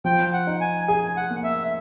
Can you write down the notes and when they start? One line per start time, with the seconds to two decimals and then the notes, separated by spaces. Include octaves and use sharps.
0.05 F3 G5
0.33 F#5
0.47 D#4
0.61 G#5
0.88 G#4 G#5
1.17 F#5
1.30 A#3
1.44 E5